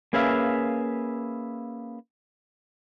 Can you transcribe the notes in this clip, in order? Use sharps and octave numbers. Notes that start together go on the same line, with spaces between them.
A#3 C#4 G#4 B4 E5 F5